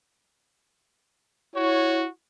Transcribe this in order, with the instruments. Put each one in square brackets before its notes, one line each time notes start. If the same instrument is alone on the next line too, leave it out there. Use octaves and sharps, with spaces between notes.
[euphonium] E4 [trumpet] F#4 [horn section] C#5